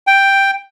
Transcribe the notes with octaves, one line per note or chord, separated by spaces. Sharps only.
G5